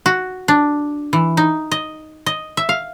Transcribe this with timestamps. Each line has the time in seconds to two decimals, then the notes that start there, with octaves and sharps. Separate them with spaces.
0.06 F#4
0.48 D4
1.13 E3
1.37 D#4
1.72 D#5
2.26 D#5
2.57 E5
2.69 F5